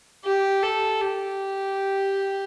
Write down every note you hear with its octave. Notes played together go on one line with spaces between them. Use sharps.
G4
A4
G4